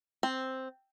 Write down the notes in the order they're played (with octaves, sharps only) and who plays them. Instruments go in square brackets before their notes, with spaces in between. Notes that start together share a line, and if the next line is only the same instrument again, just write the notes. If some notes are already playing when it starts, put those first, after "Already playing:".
[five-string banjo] C4